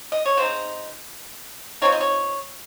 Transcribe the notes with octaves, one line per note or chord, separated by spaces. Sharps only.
D#5
C#5
C#3 G#3 C4 D#4 C5
F3 G#3 C4 D#4 C#5
D#5
C#5